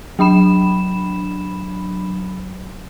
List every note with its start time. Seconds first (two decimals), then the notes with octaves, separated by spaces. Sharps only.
0.19 F#3 D4 B5 E7